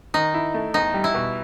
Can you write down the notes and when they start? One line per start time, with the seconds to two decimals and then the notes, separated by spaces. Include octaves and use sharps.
0.14 D#3 D#4
0.34 E4
0.54 A3
0.74 E2 D#4
0.94 G3
1.04 E4
1.14 B2